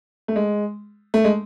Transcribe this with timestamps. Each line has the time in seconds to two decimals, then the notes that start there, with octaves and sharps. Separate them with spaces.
0.28 A3
0.36 G#3
1.14 A3
1.24 G#3